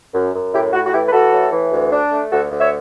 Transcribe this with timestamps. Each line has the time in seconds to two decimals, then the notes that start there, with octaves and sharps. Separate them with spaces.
0.13 F#2
0.34 F#2
0.52 A2 E4 G4
0.73 A2 F#4
0.86 F#4
0.92 E3 E4 G4
1.07 B4
1.12 E3 F#4 A4
1.32 A2
1.52 E3
1.71 D2
1.92 D4
2.11 A3
2.31 D2 F#4 A4
2.51 D2
2.60 C#5 E5